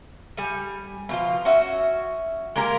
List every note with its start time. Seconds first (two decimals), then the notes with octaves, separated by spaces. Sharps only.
0.37 G3 G#5
1.09 B2 F3 F4
1.45 C#4 F#4 E5
2.56 G#3 A#3 G4 A#4